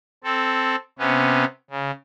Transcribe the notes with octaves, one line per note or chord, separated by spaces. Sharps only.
C4 A4
C3 B3 C#4
C#3